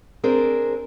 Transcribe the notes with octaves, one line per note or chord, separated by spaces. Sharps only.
C4 D4 G#4 A#4 C5